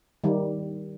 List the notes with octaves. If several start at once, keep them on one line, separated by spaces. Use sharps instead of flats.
D#3 G3